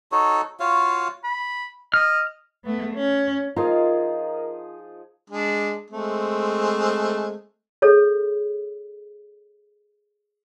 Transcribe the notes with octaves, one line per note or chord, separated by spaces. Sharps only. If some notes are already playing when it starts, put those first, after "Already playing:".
D#4 F#4 A4 C#5
F4 F#4 C#5 F5
B5
D#5 F6
A3 B3
C#4
F3 D#4 F4 G#4 A#4 A#5
G#3 D4
G#3 A3 C4
G#4 A4 C#5